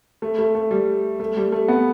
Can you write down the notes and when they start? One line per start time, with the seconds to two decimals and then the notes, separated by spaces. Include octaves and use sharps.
0.22 A3
0.38 A3
0.55 A3
0.71 G3
1.20 A3
1.37 G3
1.52 A3
1.68 B3